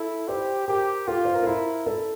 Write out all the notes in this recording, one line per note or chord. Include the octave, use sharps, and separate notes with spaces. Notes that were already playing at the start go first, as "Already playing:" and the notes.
Already playing: E4 A4
G4 C5
G4 A#4
F4 A4
C5
A#4
A4
E4 A#4
A4